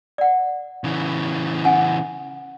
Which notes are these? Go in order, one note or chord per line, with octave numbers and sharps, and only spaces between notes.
D5 F#5
C#3 E3
C#4 F#5 G#5